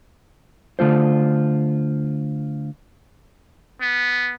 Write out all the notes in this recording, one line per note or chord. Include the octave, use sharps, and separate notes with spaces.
D3 A3 F4 C5
B3